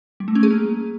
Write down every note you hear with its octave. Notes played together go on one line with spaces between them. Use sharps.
G3
A3
C#4
G#4
A#3